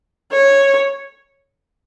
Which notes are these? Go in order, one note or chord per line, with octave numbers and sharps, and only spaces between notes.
C#5